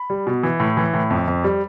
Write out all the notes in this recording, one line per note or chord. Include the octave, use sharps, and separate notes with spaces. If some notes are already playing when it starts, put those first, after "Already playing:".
Already playing: B5
G3
B2
E3
A2
E3
A2
F2
F2
G3